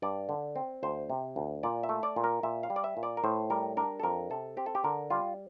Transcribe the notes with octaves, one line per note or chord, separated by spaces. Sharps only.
G2 D5
D3
C4
D2 C5
C3
D2
A#2 D5
E5
A3
D5
A#2
A#4
A#2 E5
F5
G3
D5
E5
A#2
D5
A#4
A2 C5
G3 A#4
D4 A#4
A4
F2 A#4
C3 A4
C4 G4
A4
G4
D3 A#4
G3 F4